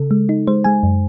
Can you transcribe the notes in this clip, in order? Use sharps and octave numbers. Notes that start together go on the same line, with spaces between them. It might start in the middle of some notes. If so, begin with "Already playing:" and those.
Already playing: C#3 A4
G#3
D#4
G#3 C5
G#3 G#5
F#2